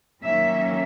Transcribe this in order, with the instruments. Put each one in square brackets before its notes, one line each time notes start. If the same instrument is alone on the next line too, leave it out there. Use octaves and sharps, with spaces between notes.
[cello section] D#3 F#3 A#3 C#4 E5